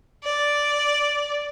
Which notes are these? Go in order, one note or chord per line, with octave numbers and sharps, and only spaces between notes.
D5